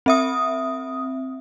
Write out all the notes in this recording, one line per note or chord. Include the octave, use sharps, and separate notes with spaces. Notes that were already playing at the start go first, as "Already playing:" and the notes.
C4 E5 D#6